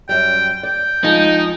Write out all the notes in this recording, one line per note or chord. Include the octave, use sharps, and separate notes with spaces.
F#2 G3 G5
D5 G5
F3 G#3 D#4